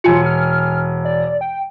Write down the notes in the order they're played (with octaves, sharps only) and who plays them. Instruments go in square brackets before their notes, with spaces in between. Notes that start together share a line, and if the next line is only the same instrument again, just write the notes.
[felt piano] E1 G#5 C#7 [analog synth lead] F4
[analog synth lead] F6
D5
G5